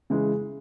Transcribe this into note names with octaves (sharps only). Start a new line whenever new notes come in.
C#3 E3 G#3